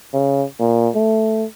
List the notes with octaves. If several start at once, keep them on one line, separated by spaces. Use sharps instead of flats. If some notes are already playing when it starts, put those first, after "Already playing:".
C#3
A#2
A3